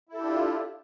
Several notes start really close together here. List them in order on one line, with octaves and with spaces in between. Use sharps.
E4 A4 G4 D4 F4